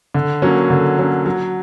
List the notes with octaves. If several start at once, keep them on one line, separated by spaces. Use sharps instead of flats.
D3
F#3 A#3 C#4
D3
F#3 A#3 C#4
F#3